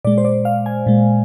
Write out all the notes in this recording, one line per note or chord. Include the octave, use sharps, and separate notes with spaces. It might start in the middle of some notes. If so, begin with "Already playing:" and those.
A#2 G#3 D5
C5
D5
F5
G#5
A#2 G#3